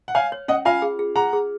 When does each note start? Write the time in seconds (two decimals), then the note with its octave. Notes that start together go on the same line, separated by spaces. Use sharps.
0.08 F#5
0.15 C#5 F5 G#5
0.32 C#5
0.48 C#4 D#5 F#5
0.65 F4 F5 G#5
0.82 G#4
0.99 G#4
1.15 G#4 F#5 A#5
1.33 G#4